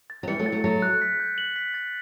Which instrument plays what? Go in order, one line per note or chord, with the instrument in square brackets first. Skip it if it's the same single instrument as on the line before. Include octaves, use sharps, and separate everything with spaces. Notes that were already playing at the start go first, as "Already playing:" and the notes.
[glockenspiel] A6
[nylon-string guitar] F#3
[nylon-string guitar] E3 G3 [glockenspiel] C#7
[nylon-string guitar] F#3 A3
[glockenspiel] A6
[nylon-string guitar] F#3 A3
[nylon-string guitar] F#3 A3 [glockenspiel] A6
[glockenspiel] F#6
B6
G6
F#7
B6
A6